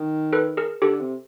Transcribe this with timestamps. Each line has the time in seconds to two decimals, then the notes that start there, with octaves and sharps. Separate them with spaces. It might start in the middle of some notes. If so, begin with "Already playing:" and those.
Already playing: D#3
0.33 A4 B4
0.57 G#4 A#4
0.82 D3 G4 A4
1.00 C3